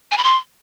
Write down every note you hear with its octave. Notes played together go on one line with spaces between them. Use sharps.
G#5
B5
C6